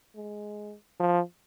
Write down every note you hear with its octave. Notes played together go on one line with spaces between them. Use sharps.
G#3
F3